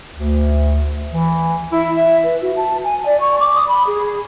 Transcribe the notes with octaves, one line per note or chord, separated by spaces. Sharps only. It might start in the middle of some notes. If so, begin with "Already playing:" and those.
D2
E3
E4
E5
B4
F#4
A5
G#5
D5
C#6
D6
D#6
B5
G#4